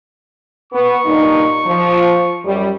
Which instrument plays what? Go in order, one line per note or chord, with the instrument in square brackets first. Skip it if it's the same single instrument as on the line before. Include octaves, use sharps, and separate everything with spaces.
[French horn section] B3 [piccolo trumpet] C#6
[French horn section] G2 A#2 D#4
F3
F#2 G3